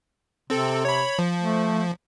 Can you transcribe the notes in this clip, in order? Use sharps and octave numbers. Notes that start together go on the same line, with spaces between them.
C3 C4 A4
C#5 B5
F3
A3